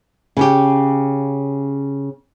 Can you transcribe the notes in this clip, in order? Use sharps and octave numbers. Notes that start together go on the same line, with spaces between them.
C#3 C#4 G4